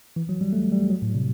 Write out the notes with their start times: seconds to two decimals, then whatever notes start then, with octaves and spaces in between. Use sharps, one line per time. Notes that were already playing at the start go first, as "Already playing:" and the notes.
0.16 E3
0.29 F#3
0.41 G3
0.53 A3
0.72 G3
0.90 F#3
1.02 A2
1.14 C3